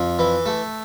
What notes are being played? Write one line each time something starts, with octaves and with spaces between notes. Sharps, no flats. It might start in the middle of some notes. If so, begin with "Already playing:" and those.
Already playing: F2
E3
A3